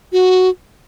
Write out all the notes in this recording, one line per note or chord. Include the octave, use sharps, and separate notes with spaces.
F#4